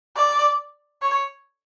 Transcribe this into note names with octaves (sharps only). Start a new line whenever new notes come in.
D5
C#5